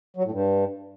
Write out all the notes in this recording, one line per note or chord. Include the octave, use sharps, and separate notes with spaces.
F#3
A2
G2